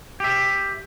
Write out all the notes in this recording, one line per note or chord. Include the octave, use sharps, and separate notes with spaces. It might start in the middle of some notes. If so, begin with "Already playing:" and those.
G4 E5